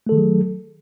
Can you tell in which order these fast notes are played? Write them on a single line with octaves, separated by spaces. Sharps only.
A3 A4 D#3 G#4 F#3